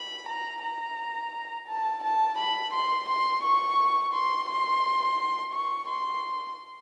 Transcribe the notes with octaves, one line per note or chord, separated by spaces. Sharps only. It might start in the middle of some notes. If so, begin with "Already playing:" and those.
Already playing: B5
A#5
A#5
A5
A5
B5
C6
C6
C#6
C6
C6
C#6
C6